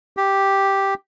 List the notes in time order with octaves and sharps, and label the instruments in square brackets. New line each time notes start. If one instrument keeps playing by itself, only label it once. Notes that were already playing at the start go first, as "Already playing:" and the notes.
[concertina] G4